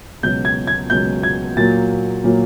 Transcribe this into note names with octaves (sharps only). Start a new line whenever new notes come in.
C#2 B2 F#3 G6
G#6
G#6
C#2 B2 F#3 G6
G#6
A#2 F#3 A#3 A6
A#2 F#3 A#3